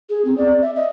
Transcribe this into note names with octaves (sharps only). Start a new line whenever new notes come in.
G#4
C4
D5
E5
D#5